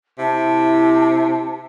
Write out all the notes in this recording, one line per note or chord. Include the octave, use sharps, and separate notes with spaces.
C3 E4 A5